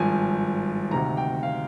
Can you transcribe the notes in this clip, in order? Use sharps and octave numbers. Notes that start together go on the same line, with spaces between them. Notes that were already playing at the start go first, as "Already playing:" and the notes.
Already playing: G#1 G2 F3 G#5
D2 C3 D#3 A#5
G5
F5